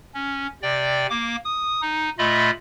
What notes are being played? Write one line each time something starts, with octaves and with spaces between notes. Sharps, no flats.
C#4
C3 D5 G5
A#3 D6
D#6
D#4
A#2 A3 F4 D#5 E5 B5